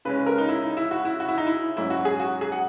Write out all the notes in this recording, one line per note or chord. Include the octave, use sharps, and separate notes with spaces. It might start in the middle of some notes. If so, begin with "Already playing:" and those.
C#3 G#3 C#4 B4
A#4
D#4
E4
D#4
E4
F#4
E4
F#4
E4
D#4
E4
G#2 F#3 C#4 E4
F#4
G#4
F#4
G#4
F#5